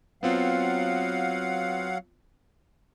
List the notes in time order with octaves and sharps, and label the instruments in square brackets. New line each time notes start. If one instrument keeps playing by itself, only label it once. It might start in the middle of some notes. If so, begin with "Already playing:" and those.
[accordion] F#3 F5 F#5 [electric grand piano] B3 C4 F4